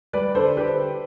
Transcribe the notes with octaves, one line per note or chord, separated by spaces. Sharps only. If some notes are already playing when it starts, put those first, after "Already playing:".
G3 B4 D5
D3 A4 C5
D3 G4 B4